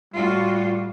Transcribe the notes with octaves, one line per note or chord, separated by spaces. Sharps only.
A2 G3 F4 F#4